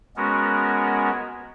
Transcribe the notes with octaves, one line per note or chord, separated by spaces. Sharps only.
G#3 B3 C#4 F#4 A#4